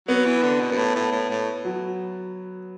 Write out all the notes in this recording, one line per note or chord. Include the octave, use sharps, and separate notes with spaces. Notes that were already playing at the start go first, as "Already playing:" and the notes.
F#3 B3
E3
D3
B2
F#2
A2
A2
A2
A2
F#3